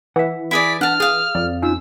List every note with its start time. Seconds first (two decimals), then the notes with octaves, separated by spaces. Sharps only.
0.16 E3 E5 F#5
0.51 E4 G#4 D5 B6
0.81 D4 F#5 A5 F6
1.00 G#4 F5 D#6
1.35 F2 D5
1.62 C#4 D#4 F4 E6